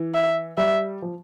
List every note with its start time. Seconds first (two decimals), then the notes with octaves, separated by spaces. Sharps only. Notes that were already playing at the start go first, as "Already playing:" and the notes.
Already playing: E3
0.14 E5
0.57 G3 E5
1.02 F3